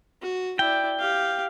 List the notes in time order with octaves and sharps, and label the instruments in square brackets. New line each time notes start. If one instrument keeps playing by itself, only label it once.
[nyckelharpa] F#4
[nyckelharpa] E4 D5 [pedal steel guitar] G5
[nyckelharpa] G4 F5